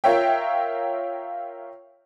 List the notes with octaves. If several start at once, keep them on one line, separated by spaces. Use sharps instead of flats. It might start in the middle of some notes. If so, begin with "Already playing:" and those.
F4 A#4 C#5 E5 G5